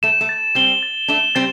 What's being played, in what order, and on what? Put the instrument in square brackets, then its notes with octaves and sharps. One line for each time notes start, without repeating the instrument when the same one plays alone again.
[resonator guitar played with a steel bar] A3 [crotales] E7
[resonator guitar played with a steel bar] A3
[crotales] A6
[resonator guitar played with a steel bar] G3 C4 [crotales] G7
[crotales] A6
[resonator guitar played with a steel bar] A3 D4 [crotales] E7
[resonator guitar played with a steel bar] G3 C4 [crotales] A6